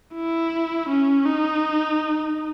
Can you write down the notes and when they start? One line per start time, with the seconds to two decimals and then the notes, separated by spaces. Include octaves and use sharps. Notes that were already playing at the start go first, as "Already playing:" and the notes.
0.14 E4
0.89 C#4
1.25 D#4